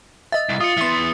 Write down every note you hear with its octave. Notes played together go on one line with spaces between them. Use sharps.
D#5 E5 A6
C2
F4 D#6 C#7
E3 B3 E5 C6